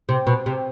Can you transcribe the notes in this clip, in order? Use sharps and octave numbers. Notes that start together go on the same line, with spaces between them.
C3
B2
C3